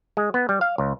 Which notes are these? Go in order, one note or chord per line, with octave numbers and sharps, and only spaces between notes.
G#3
B3
G3
F5
C#2